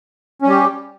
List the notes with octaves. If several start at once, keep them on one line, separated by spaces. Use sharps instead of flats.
G3 C#4 G4